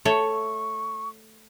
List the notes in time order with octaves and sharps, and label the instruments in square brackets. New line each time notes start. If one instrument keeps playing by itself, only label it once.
[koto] A3 A4 C#5 [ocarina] C#6